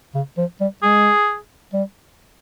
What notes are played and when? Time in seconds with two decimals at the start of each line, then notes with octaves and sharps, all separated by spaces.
0.15 C#3
0.38 F3
0.60 G3
0.83 G#3 G#4
1.73 G3